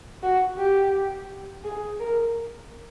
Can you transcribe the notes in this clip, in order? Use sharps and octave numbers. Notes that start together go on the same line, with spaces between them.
F#4
G4
G#4
A#4